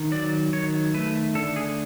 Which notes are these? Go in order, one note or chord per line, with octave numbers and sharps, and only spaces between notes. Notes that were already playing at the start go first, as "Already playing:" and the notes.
Already playing: D#3
F#3 D5
D#3 C#5
A3 B4
D3 A4
G#4